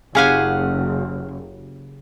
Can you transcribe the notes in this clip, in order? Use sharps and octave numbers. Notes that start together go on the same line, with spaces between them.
F#1 C#3 G4 G#4 F5 F#5 G#5